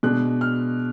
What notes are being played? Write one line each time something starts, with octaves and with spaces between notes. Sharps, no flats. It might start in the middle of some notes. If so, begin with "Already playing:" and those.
B2 G#3 D4 F#6
F6